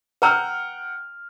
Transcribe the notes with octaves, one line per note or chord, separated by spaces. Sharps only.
B4 F#5 G5 A#5 E6 F6